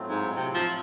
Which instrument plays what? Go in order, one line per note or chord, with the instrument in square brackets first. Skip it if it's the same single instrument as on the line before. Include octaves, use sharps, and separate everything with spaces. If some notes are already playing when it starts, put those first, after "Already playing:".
Already playing: [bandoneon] A2 F#3 A3 C4 F4
[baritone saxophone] G#2
C3
F3